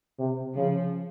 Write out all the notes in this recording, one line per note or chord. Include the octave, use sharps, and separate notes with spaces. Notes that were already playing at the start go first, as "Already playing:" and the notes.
C3
C#3 F3